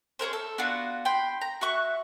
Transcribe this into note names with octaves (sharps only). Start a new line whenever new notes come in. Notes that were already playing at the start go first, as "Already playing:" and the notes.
C#4 G#4 A#4 C5
A4
B3 D4 F4 F#4
G5 B5 C6
A#5
F#4 E5 C#6 F#6